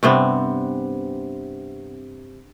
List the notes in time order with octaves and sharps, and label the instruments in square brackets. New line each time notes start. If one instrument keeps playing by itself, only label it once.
[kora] G2 C3 B3 C4